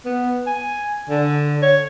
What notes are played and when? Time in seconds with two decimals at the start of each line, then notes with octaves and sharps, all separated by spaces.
0.06 B3
0.47 G#5
1.09 D3
1.62 C#5